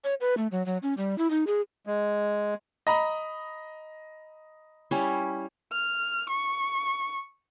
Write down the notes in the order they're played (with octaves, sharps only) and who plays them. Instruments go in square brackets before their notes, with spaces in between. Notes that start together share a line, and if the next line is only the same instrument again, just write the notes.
[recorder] C#5
B4
A3
F#3
F#3
C#4
G3
E4
D#4
G#4
[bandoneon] G#3
[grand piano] D#5 A#5 B5
[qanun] G3 C#4 E4
[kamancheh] F6
C#6